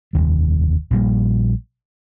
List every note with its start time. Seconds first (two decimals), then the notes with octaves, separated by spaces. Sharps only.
0.13 F1 D#2 D#3 G3
0.90 A#1 G3 A#3